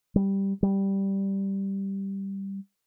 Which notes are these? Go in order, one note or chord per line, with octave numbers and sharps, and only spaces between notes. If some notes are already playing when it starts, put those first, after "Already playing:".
G3
G3